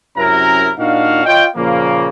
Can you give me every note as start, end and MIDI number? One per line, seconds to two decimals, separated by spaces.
0.17 0.71 42
0.17 0.71 48
0.17 0.71 61
0.17 0.71 64
0.17 0.71 70
0.17 0.71 82
0.78 1.22 46
0.78 1.22 62
0.78 1.22 63
0.78 1.22 66
0.78 1.22 77
1.25 1.44 65
1.25 1.44 73
1.25 1.44 75
1.25 1.44 79
1.56 2.08 46
1.56 2.08 49
1.56 2.08 53
1.56 2.08 58